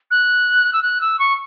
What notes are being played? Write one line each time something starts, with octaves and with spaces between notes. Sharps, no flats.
F#6
E6
F#6
E6
C#6